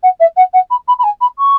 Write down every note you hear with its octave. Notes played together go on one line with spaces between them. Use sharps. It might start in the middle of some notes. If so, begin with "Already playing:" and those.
F#5
E5
F#5
F#5
B5
B5
B5
G#5
B5
C#6